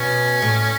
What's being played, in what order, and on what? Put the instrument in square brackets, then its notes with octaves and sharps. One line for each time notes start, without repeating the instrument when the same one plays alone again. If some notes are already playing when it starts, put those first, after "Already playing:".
Already playing: [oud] B2 [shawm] C#4
[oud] A2